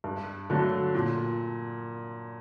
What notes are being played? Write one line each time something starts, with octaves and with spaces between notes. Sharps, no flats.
G2
D3 F#3 A3
A#2